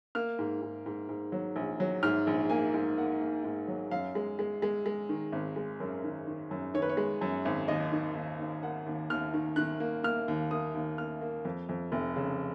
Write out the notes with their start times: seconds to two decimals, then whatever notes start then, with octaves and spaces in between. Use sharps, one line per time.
0.15 A#3 F6
0.39 G#2
0.62 G#2
0.86 G#2
1.09 G#2
1.32 F#3
1.56 A#1
1.80 F#3
2.03 G#2 F6
2.27 A#1
2.50 A#3 G#5
2.74 G#2
2.98 A#3 F#5
3.20 A#3
3.44 G#2
3.68 F#3
3.91 F#2 F5
4.15 G#3
4.39 G#3
4.62 G#3
4.86 G#3
5.09 D#3
5.32 G#1
5.56 G#3
5.80 F#2 A#4
6.04 D#3
6.27 D#3
6.51 F#2
6.74 D#3 C#5
6.82 B4
6.89 C#5
6.97 G#3
7.21 F#2
7.45 G#1
7.68 D#2 D#5
7.92 D#3
8.15 D#2
8.39 D#2
8.63 A#3 F#5
8.86 D#2
9.10 D#2 F6
9.34 D#3
9.56 D#3 F#6
9.80 A#3
10.03 A#3 F6
10.28 D#2
10.51 A#3 D#6
10.74 D#2
10.98 A#3 F6
11.21 A#3
11.45 F2
11.69 F2
11.92 F1
12.16 C#3